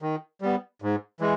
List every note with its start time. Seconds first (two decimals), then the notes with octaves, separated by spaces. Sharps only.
0.02 D#3
0.41 G3 B3
0.82 G#2
1.20 E3 G#3